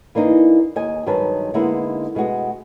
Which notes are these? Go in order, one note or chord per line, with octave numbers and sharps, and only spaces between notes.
E3 A#3 D4 D#4
D#2 D#5 G#5
G2 D#3 F#3 G#3 B4 A5
D3 G#3 A#3 B3 D#4 E4
B2 G#3 A3 F#4